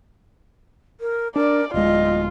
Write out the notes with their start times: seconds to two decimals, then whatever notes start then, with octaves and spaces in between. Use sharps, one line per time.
1.00 A#4
1.36 D4 A#4 D5
1.74 D1 G#3 F4 D#5